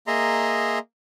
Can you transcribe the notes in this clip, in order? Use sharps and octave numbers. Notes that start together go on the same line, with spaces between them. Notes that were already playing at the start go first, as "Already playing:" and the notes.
A#3 G#4 D#5 E5 A#5 C6